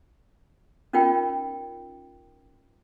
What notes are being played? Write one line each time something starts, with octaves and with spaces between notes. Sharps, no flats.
C#4 D#4 F4 A#4 G5